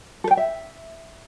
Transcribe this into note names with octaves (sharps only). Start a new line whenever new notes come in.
A4
G5
E5